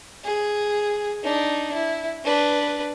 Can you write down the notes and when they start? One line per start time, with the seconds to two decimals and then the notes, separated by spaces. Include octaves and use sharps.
0.24 G#4
1.23 D4 D#4
1.74 E4
2.24 D4 B4